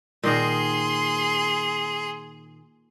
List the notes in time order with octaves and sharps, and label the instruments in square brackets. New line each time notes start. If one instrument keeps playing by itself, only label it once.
[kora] A#2 D#3 D#5 [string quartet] G#4 C6